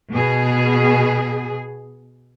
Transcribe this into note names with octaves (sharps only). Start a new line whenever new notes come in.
B2 G#4